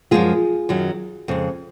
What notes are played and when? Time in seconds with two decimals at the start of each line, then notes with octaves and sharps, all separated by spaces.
0.11 F#2 F3 G#3 F4 G#4
0.69 F#2 D#3 F#3
1.28 F2 C#3 G#3